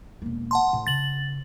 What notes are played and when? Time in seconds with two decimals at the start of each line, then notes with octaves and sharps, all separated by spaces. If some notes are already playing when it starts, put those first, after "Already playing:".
0.22 E1 A#3
0.51 F#5 A5 C6
0.73 A2
0.87 C#3 A6 F#7